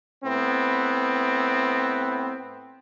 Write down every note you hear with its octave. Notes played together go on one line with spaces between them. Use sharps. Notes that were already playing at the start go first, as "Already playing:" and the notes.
A2 B3 C4